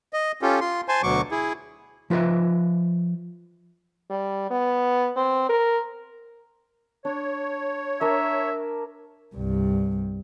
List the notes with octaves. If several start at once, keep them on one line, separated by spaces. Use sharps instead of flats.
D#5
C#4 F4 G4 A4
F4 C6
C5 G#5 A5 C6
D2 B2 F#3 C#6 D6
E4 G#4
F3 F4 B4 D#5 E5
G3
B3
C4
A#4
D4 C#5
D4 A#4 E5
C2 G2